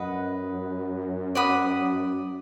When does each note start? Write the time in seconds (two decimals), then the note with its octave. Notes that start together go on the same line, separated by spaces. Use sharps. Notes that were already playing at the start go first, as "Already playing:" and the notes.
Already playing: F#2 B4 D#5 F#5
1.35 D5 F#5 B5 D#6